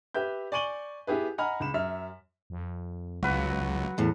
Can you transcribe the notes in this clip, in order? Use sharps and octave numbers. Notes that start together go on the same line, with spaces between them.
G4 B4 E5 G6
D5 G#5 C#6 D#7 F#7 G7
B3 E4 G4 G#4 B4
D#5 F#5 G#5 A#5 B5 F6
C#2 B5 E7
F#2 E5 F6
F2
C#2 F#3 F#4 B4
E2 A2